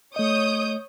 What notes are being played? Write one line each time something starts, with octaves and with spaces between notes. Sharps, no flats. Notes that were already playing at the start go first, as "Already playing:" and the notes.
A3 C#5 D#5 D#6 G6